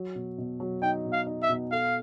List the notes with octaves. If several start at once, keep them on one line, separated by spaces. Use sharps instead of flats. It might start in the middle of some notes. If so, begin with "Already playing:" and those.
Already playing: F#3
B2
B2
F#3
D#4 G5
B2
F5
D#4
E5
B2
A4 F5